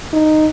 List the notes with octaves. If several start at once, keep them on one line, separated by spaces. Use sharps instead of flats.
D#4